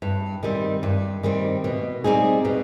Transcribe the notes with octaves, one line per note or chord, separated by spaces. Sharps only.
G2
D#3 G3 C4
G2
D#3 G3 C4
B2
G3 C4 D#4 G#4
B2